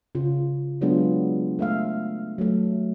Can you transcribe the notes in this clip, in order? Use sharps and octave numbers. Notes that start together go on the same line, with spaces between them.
C#3 F4
F#3 G#3 B3 D4 F4 G#4
A3 E5 F5
F#3 A3